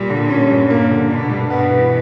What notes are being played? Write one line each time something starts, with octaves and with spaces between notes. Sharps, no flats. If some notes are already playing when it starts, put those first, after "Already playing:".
Already playing: A#2 G3
D3
C#4
G2
A#3
D3
B2 D4
G2
B2 B3
E3